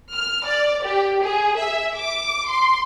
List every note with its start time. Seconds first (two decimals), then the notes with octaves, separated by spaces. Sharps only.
0.14 F6
0.46 D5
0.85 G4
1.22 G#4
1.58 E5
1.96 D6
2.47 C6